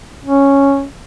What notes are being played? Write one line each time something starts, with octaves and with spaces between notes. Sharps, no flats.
C#4